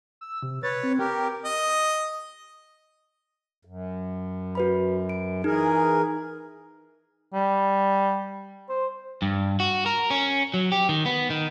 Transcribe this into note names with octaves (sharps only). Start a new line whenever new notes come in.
E6
C3
B4 C#5 A6
C4
G4 A#4 G5
D#5
F#2
F#4 B4 B5
D7
E3 D#4 G#4 A#4
G3
C5
G2
F#4
A#4
C#4
F#3
G4
D#3
B3
D#3